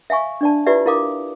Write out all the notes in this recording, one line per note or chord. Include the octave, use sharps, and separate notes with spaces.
E5 F5 G#5 C#6
D4 D5 A5
E4 F4 G4 B4 D5 E5
E4 A#4 F5 D6 D#6